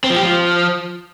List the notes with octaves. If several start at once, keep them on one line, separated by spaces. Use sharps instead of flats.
C4
F3
G4
F3